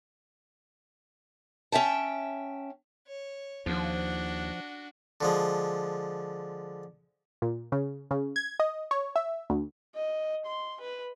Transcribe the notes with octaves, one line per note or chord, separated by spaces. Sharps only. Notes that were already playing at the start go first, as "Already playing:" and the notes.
C#4 E5 G5 A5
C#5
D#2 F3 D4 F#4
D3 F3 G#3
A#2
C#3
C#3
G#6
D#5
C#5
E5
D2
D#5
C6
B4